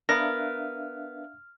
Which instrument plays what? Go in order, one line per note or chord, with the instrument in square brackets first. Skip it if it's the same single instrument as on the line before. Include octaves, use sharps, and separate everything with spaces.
[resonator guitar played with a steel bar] B3 A#4 [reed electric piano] D4 E5 F5 [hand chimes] F6 [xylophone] A#6